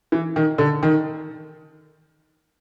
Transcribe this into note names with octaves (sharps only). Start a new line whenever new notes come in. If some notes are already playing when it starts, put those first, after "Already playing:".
E3
D#3
D3
D#3